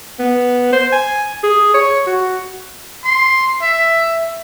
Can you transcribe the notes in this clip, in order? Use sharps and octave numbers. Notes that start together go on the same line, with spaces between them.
B3
C5
G#5
G#4
C#5
F#4
C6
E5